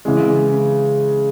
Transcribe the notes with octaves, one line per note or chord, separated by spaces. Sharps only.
C#3 E3 G#3